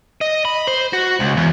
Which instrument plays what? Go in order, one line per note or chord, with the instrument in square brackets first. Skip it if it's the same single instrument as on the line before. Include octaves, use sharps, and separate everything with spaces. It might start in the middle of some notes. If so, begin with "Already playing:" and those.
[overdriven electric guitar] D#5
B5
C5
F#4
C#2
E2